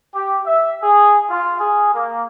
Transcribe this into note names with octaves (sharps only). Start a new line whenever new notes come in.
G4
E5
G#4
F4
G#4
A#3